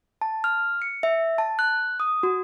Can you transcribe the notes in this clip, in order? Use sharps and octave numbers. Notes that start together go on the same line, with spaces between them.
A5
F6
C#7
E5
A5
F#6
D#6
F#4